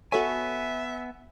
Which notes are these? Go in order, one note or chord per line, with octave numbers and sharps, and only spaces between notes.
B3 F#4 A4 C#5 E5 G#5